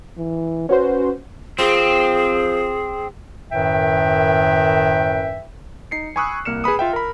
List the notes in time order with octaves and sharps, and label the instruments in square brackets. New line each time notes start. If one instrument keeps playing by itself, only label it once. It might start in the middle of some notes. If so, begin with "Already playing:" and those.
[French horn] E3
[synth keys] C#4 F#4 C5 [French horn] B4
[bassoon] F3 [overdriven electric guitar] C4 [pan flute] G#4
[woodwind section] F#2 A2 D#3 B4 E5 G5
[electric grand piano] D#4 C7 C#7
G#5 B5 C#6 D#6 E6 F#6
C2 A#3 F6 C#7 E7
G#4 B4 B5 D#6
F4 E5 G5
A#4 B5